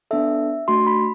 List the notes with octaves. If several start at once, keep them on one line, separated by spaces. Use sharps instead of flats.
B3 D4 A4 E5
A3 D4 F#4 C6
B5